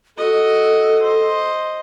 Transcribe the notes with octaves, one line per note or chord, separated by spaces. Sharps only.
F#4 A4 D#5
C5 D#5